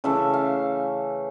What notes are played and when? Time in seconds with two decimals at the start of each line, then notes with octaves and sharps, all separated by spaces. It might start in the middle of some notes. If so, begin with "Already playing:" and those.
0.04 C#3 E3 A3 E5
0.34 F5